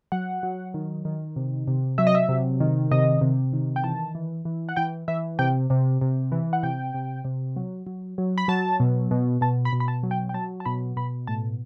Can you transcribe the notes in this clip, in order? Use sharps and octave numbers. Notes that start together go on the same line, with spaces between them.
F#3 F#5
F#3
D#3
D#3
C3
C3
F#3 E5
D#5
E5
C3
D#3
C3 D#5
C3
D#3
G5
E3 A5
E3
E3
F#5
E3 G5
E3 E5
C3 G5
C3
C3
E3
F#5
C3 G5
C3
C3
F#3
F#3
F#3
B5
F#3 A5
B2
B2
B2 A5
B5
B2
B5
A5
F#3
G5
G5
F#3 A5
A5
B2 B5
B2 B5
A2 A5